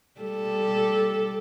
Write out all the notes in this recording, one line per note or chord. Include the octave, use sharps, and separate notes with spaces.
G3 A4